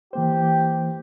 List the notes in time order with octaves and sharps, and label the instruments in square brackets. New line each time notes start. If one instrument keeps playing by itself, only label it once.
[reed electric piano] E3 A#3 C5 [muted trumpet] G4